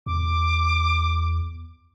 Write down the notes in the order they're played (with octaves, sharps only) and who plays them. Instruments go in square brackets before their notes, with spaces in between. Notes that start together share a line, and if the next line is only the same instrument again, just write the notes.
[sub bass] E2 [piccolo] D6